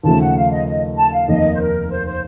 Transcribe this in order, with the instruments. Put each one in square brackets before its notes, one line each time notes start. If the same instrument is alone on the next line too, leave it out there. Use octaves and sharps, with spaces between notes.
[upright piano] D#2 C#3 F3 A3 [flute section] A5
[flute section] F#5
F5
D#5
D#5
A5
F5
[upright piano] F1 D#2 D#3 A#3 [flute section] D#5
[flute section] C5
A#4
C5
C5